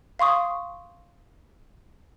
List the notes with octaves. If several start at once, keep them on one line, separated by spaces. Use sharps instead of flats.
F5 C6 C#6 D#6